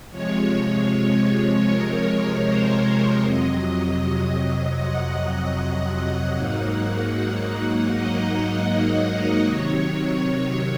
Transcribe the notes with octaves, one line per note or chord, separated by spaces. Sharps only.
C3 F3 G#3 C#5
A#4
C5
C#5
F2 C3 F#3 D#5
F#5
G#2 F#3 A#3 D#4
D#5
C3 D#3 F#3 C#5